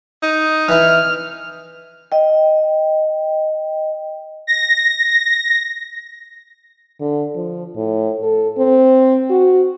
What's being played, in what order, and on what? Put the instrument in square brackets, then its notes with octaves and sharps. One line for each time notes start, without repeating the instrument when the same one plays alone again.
[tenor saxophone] D#4
[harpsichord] E3 E4 [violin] F6
[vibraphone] D#5 G5
[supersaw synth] A#6
[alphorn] D3
F3
A2
A4
C4
F#4